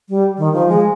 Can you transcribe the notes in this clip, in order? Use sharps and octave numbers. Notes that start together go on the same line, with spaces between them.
G3
D#3
F3
G#3